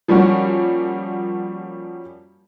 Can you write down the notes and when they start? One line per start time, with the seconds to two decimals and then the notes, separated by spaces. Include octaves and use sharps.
0.08 F3 G3 A#3 C#4 F#4